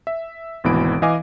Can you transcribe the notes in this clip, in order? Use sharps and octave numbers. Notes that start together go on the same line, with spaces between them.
E5
G#1 D2 B2 E3 B5 D7
E3 D#5 F5 G#5 D6